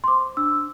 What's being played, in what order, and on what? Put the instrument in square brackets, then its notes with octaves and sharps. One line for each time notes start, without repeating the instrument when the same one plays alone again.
[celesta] C6
C5 D6
D4 E6